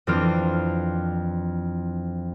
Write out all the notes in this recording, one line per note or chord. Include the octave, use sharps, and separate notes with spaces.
F2 E3 C4 D4 F4 F6